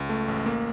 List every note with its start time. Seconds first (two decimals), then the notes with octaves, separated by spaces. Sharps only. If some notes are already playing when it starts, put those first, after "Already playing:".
Already playing: C#2
0.09 A3
0.28 A1
0.46 A#3